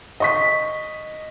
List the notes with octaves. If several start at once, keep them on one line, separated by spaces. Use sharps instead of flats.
D#5 C#6 B6